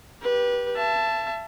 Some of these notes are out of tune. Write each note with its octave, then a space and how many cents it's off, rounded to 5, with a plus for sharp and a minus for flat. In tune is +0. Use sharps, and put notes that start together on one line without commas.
G4 -5 B4 -25
E5 +35 A5 +0